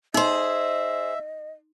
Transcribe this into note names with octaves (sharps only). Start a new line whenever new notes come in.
D#4 G#4 C5 D#5 E5 C6